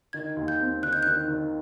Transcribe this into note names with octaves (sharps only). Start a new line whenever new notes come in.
D#3 G#6
D#2
G6
C4
D#3 F#6
G6
D#3 F#6
D#3